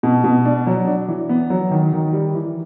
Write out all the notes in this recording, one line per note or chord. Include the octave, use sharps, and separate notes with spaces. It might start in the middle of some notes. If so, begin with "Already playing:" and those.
B2
B2
D4
F#3
D4
E3
B3
F#3
D#3
D#3
G3
E3